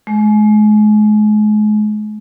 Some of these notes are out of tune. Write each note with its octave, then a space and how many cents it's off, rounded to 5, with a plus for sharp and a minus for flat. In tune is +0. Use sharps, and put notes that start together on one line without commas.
G#3 +35